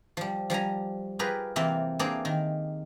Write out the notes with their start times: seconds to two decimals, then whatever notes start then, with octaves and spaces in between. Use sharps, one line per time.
0.17 F3 G3
0.50 F3 G3 G#5 A#5
1.19 F4 G4 G#4 A#4 B4
1.56 C3 E3 A#3 C4
1.99 E3 A#3 C4 D4 G#4 D5
2.25 D#3